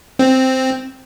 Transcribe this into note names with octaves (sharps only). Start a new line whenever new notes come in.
C4